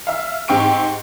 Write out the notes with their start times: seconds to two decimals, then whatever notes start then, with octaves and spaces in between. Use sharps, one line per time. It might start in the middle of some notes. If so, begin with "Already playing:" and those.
0.07 E5 F5
0.48 G#2 C4 G4 C#6 D7